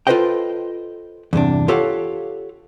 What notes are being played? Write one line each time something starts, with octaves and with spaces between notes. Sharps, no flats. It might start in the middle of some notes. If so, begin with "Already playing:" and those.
F4 A4 B4 C5 D#5 G5
E2 G2 C3 D4
F4 G4 A4 C#5 F5 F#5